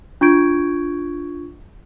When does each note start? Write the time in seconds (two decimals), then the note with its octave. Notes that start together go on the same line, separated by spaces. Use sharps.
0.21 D4 F4 C#6 G6 G#6 D7